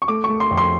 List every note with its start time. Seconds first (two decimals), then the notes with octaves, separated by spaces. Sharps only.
0.02 C#6
0.08 A3 D6
0.24 C#6
0.29 A3
0.40 C6
0.51 F2
0.57 C6